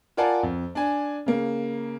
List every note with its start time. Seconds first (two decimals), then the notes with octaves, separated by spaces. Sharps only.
0.17 F4 A#4 D5 F#5 G#5 A5
0.43 F2
0.75 D4 G#5
1.26 C#3 A#3